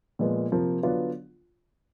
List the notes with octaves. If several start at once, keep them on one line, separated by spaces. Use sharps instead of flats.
A#2 F3 G#3 B3
C3 F3 A#3
D3 F#3 B3 D4 F4